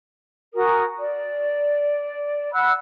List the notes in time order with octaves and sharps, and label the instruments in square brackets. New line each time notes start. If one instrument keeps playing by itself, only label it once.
[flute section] F#4 A#4 G#5 D#6
D5
F#5 B5 E6 F#6